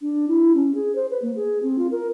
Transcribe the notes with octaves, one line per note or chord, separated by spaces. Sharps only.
D4
E4
C#4
G#4
C5
B4
A#3
G#4
C4
F4
A#4